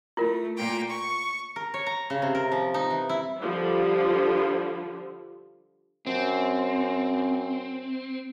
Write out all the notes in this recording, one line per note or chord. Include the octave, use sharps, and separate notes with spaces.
A3 E4 F4 A#4
A#2 A#3 G5
C#6
A#4
C#5
A#5
C#3
C3
A#4
F3
D#4
E3
E4
D3 F3 G3
F#2 C4